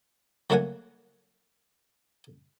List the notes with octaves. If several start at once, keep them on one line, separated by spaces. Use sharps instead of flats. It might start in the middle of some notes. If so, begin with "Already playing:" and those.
F#3 A3 A#3 A#4 F#5 G#5